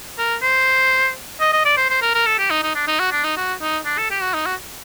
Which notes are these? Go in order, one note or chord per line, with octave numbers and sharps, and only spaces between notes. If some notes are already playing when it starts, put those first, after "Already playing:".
A#4
C5
D#5
D#5
D5
C5
C5
A#4
A#4
A4
G4
D#4
D#4
D4
D#4
F#4
D4
D#4
F#4
D#4
D4
A4
G4
F#4
D#4
F#4